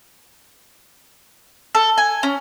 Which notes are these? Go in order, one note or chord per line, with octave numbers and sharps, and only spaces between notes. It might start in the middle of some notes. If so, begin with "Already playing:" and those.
A4
G#5
C#4